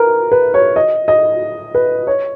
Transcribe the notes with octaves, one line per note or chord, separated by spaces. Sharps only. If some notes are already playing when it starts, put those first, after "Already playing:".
Already playing: A#4 B4
B4
C#5
D#5
D#5
B4
C#5